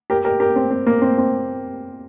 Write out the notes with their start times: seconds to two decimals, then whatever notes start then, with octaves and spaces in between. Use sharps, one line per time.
0.10 G4 A#4
0.25 G4 A#4
0.40 G4 A#4
0.56 C4
0.71 C4
0.87 A#3
1.02 C4
1.18 C4